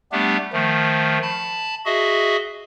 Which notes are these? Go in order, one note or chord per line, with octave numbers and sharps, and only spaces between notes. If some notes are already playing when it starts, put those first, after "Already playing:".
G3 A3 B3 D4 G4
D#3 F3 A3
A5 B5
F#4 G#4 D#5 E5